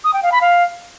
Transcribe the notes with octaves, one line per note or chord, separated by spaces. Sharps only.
D#6
G5
F5
B5
F5